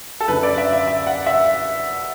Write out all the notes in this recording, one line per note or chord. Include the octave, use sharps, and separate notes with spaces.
A4
F#2 D3 B4
D5
E5
E5
E5
F#5
E5